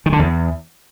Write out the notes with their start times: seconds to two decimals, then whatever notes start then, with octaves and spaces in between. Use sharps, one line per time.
0.06 D#3
0.13 D3
0.19 E2